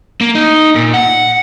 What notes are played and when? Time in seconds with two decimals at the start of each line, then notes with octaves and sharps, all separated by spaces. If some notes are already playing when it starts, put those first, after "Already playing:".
0.21 A#3
0.35 D#4
0.75 A#2
0.94 F#5